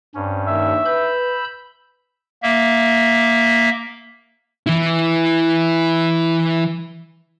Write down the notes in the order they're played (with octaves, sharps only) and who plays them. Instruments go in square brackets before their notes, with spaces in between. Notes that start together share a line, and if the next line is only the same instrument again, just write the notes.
[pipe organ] G2 C#4 [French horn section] C4
[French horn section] D#2 [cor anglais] E5
[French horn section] B4 [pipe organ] B5 E6 G6
[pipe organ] A#3 E5
[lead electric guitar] E3 E4